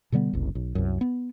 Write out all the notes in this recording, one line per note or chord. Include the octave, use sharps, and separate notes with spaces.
B2 D3 G3 B3
F#1 C2
B1
C2 F#2
B3